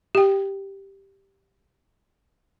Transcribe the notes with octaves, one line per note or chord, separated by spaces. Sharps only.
G4 G5